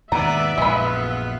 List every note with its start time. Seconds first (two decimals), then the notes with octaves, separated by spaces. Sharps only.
0.12 D#2 G#2 B2 B3 D5 E5 A#5
0.58 A#1 F#2 G#3 B3 F4 B5